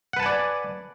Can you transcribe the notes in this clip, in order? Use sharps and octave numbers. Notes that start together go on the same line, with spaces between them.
B4 D5 F#5 G#5 A5